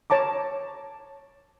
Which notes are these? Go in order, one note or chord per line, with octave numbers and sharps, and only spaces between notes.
C#5 A5 A#5 D6